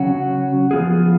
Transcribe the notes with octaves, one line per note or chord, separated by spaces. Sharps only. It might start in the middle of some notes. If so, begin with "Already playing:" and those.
Already playing: C#3 F#3 C#4 F#4
F3 B3 F4 G#4